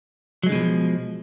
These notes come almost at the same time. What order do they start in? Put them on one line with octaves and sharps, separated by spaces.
F#3 G#3 D3 B2 F3